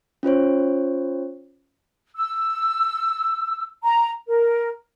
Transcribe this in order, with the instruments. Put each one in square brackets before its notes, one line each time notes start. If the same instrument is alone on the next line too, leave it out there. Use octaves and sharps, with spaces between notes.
[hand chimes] C#4 F4 C5 C#5
[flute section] E6
A#5
A#4